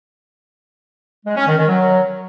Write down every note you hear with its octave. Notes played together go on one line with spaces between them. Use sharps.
G#3
C#4
D#3
D#3
F#3